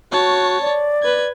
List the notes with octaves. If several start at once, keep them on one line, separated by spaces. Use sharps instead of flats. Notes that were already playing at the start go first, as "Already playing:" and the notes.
F#4 C#5 A5
D5
B4 G#6